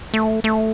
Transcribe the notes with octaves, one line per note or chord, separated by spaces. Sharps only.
A3
A3